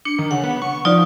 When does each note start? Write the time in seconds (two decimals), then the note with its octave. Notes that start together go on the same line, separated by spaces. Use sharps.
0.05 D4 C#7
0.19 D#3
0.31 C#3 F#5
0.44 B3
0.62 C#6
0.85 F3 D#4 F4 D5